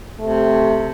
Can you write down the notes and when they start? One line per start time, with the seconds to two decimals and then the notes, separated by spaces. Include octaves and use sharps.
0.20 C3 A3